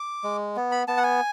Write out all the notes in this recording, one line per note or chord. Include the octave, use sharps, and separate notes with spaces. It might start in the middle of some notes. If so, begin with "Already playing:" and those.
Already playing: D6
G#3
B3
B5
B3 A5
F#5
G#5